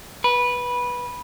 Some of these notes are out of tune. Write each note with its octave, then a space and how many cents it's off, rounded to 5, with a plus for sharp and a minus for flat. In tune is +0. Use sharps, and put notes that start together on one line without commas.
B4 -15